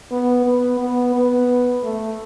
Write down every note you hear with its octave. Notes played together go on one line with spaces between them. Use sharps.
B3
B3
B3
B3
A3